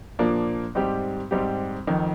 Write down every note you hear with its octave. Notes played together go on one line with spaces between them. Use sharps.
A#2 F3 A#3 D4
G#2 G3 C4 G4
G#2 G3 C4 G4
F1 F2 D#3